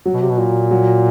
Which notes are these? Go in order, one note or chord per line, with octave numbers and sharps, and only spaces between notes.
F#3
B2
C3
B2
A#2
F#3